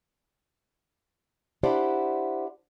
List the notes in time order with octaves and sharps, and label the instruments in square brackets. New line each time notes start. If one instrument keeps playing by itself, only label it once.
[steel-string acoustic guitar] D4 E4 G4 C5 D5 F#5